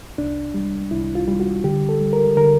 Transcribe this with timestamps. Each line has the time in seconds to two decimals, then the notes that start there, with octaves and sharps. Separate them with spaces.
0.18 C2 D4
0.54 G3
0.91 C2 E4
1.15 F4
1.28 G3
1.40 F#4
1.64 D3 G4
1.89 A4
2.01 G3
2.13 A#4
2.37 D3 A#4